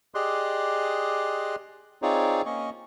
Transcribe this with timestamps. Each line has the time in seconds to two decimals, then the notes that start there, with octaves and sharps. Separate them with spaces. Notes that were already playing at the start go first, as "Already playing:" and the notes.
0.15 G4 G#4 D5 D#5 C6 F#6
2.02 C4 D#4 F4 G#4 C#5 D5
2.46 A#3 C#4 D#5 C#6